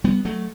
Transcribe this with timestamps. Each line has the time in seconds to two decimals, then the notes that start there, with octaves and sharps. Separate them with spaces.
0.04 G3 B3
0.25 F#3 A3